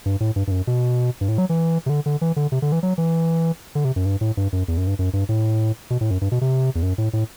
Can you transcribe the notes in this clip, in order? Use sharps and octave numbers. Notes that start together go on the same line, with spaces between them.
G2
A2
G2
G2
F#2
B2
G2
A2
F#3
E3
C3
D3
D3
E3
D3
C3
D3
E3
F#3
E3
D3
C3
F#2
G2
A2
G2
F#2
E2
F#2
G2
F#2
G2
A2
B2
A2
F#2
G2
B2
C3
E2
F#2
A2
A2